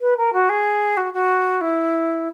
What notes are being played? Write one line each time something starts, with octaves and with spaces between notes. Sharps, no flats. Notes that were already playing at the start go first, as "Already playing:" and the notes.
B4
A#4
F#4
G#4
F#4
F#4
E4